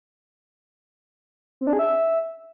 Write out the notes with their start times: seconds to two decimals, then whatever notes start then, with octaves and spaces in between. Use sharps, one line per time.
1.61 C4
1.67 D4
1.73 G#4
1.79 E5